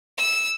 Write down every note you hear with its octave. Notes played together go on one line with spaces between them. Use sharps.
E6